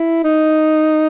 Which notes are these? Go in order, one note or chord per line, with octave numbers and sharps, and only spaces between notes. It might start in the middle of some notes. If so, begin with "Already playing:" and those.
Already playing: E4
D#4